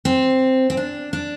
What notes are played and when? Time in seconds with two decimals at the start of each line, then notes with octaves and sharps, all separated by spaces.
0.05 C4
0.70 C4
0.77 D4
1.13 D4